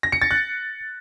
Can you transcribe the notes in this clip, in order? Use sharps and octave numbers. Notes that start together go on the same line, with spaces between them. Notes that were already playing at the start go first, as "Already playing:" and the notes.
A#6
C#7
A6
F#6